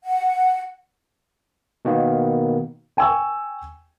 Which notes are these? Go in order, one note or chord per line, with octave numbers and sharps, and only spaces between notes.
F#5
B2 D#3 A#3 B3
G5 G#5 C#6 E6